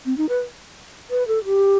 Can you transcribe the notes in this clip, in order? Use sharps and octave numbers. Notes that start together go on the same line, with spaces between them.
C4
D#4
B4
B4
A4
G4